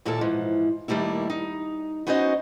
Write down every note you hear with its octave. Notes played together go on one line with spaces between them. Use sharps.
D#2 A#2 A#3 E4 A4 A5
G#2 E3 F3
D#3 G3 A3 A#3 E4
D#4
B3 C#4 D#4 F#4 C5 D#5